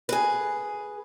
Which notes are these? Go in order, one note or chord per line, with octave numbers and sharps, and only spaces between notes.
G#4 B4